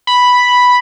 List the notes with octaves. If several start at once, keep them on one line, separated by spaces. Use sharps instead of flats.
B5